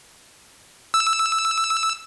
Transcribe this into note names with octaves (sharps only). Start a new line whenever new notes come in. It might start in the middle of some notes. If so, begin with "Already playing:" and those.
E6